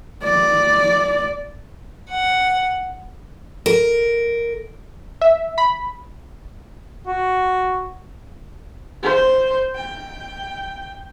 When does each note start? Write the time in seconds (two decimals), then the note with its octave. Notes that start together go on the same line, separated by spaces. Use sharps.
0.24 D5
2.09 F#5
3.66 A#4
5.21 E5
5.58 B5
7.07 F#4
9.03 C5
9.75 G5